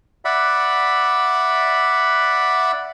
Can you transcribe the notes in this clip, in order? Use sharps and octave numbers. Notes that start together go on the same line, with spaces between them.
D5 E5 F#5 B5